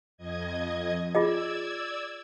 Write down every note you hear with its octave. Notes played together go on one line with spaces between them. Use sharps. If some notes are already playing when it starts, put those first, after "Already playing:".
F2 D#5 G#6
F4 G#4 D5 D#5 E6 G#6